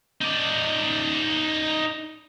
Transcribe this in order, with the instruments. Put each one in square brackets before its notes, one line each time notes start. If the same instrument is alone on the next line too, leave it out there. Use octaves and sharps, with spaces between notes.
[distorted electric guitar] D#4 D5